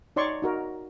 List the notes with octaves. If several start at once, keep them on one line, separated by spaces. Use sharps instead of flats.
D#4 C#5 D5 C6 C#6
D#4 F#4 A#4